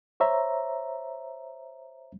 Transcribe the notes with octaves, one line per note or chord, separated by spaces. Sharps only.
C5 C#5 E5 A#5